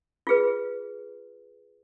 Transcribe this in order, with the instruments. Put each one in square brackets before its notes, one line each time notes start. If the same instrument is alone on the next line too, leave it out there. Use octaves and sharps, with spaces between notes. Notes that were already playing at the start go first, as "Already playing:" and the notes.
[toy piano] F4 G#4 B4